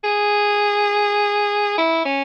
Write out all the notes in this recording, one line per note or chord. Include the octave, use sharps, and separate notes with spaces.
G#4
E4
C#4